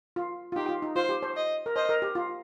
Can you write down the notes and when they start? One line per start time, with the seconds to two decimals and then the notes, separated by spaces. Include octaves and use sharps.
0.16 F4
0.52 F4
0.56 D#4 G4
0.69 F4
0.82 D#4
0.96 F4 C5
1.09 G4
1.22 C5
1.36 D#5
1.66 A#4
1.76 C5 D#5
1.89 A#4
2.02 G4
2.15 F4